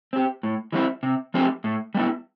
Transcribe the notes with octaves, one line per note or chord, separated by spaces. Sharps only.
C4 G4
A2
E3 G3 C4 E4
C3
F3 A3 C4 G4
A2
G3 B3 E4